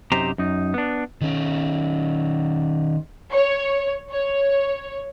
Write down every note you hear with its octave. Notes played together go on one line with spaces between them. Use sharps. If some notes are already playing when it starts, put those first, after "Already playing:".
F#2 C3 D#4 G4 C5 A#5
F#2 D#4
B3 D4
D#3 C#4
C#5
C#5